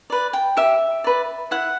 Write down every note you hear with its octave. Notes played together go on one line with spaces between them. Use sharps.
B4 D5
G5
G4 E5
B4 D5
E4 F#5